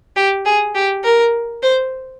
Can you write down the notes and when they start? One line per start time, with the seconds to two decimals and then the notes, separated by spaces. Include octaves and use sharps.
0.16 G4
0.45 G#4
0.75 G4
1.04 A#4
1.63 C5